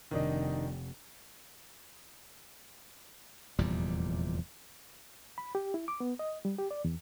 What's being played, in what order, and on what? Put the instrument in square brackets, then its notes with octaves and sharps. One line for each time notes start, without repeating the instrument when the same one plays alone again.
[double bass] F1 [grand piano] D#3 D4 D#4
[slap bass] F1 E2 A#2 G3
[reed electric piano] B5
G4
E4
D6
B3
D#5
G3
G4
D5
E2